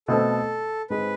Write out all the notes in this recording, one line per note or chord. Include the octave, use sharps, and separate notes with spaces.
B2 A3 C4 A4
G#2 G#3 C4 B4